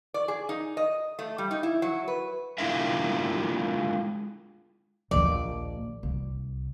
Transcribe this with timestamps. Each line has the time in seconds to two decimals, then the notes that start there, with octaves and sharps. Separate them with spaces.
0.14 D5
0.28 G#4
0.49 D#4
0.77 D#5
1.19 A3
1.38 G3
1.51 D#4
1.63 E4
1.82 F#3
2.08 B4
2.58 G#3 D4 E4 F4 A#4 E5
5.11 A#1 D#2 D5
6.03 C2